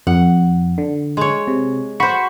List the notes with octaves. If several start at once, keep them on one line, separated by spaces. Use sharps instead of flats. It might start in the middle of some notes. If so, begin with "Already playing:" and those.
F2 F#5
D3
G#3 C#5
C3
F#4 C5 B5 C#6